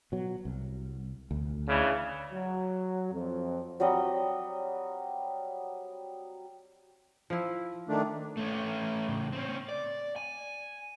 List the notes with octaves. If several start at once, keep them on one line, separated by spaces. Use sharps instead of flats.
B2 F#3
C2
D2
C#3 E3 D4
F#3
F2
F#3 G3 C4 D#5
F3 E4
D#3 A3 D4
A3 C#4
A2 C#3
C4 C#4
D5
G#5